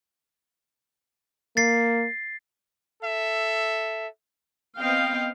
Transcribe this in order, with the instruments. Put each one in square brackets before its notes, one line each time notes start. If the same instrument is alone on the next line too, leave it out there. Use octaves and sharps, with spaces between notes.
[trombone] A#3 [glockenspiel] A6 C7
[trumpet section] A4 E5
[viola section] B3 C4 D#5 F5 G5